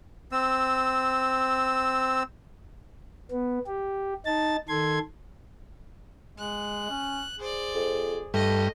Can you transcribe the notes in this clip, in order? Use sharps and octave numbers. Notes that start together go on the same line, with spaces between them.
C4 E6
B3
G4
D#4 A5 A6
D#3 A4 C6 G#6
G#3 F#6
C#4
G#4 C5 D5
F2
G2 A3 D#5